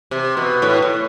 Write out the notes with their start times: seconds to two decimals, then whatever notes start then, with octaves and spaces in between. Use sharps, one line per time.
0.11 C3
0.37 B2
0.62 A2
0.82 A2